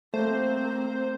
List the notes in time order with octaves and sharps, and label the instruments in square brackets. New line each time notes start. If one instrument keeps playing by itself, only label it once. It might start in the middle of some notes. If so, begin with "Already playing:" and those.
[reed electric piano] A3 [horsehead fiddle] A#3 C4 [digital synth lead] C5